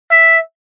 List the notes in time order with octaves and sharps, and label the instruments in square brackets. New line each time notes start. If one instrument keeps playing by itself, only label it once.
[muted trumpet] E5